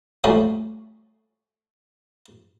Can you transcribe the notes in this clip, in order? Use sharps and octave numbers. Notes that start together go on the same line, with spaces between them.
F3 G3 A3 A#3 C#4 F#4